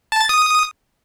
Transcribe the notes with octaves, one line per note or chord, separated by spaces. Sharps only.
A5
A6
D#6